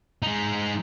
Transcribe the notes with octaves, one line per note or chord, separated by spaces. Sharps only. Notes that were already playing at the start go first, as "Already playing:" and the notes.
G#3 D#4